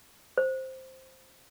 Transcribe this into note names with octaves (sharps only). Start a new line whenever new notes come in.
C5